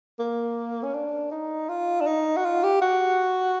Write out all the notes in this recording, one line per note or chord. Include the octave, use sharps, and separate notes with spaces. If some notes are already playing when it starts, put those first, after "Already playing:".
A#3
C#4
D4
D#4
F4
D4
D#4
F#4
F4
G4
F#4